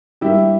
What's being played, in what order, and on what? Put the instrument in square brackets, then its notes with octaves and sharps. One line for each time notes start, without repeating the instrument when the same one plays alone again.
[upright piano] G2 G3 A#3 E4 G4